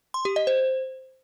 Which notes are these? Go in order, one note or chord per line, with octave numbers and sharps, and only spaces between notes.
C6
G4
D#5
C5